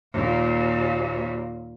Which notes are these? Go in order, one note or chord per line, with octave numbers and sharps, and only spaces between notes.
D#2 A#2